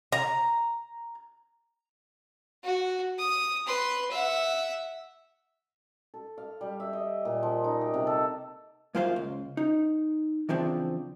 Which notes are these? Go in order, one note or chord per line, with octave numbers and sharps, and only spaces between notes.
A#5
F#4
D#6
B4 C6
E5 F#5
A4
F5
G3
E5
D#5
A#2
F3
D#4
G4
C3
A4
F#2 A#3 F4 C5 C#5 F5
C#2
D#4
C#3 E3 F3 C4 D4